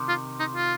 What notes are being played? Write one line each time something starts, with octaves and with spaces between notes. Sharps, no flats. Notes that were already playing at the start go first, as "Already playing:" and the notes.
Already playing: C3 D#3
F4
D#4
F4